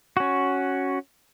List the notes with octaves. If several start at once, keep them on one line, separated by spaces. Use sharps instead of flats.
C#4 F#4